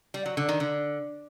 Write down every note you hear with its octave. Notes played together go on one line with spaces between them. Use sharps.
G3
F#3
D3
D#3
D3